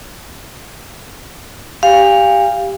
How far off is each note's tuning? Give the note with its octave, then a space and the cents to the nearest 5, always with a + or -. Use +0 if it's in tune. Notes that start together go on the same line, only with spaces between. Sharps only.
G4 +0 F5 +0 G#5 -40